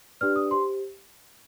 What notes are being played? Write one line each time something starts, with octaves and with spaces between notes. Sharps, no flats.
D4 G4 B4 D5 F6
D#6
G4 C5 C6